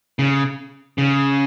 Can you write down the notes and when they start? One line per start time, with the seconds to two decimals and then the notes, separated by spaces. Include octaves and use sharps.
0.19 C#3
0.98 C#3